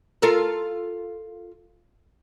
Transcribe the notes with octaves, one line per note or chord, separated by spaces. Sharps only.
F4 A4 A#4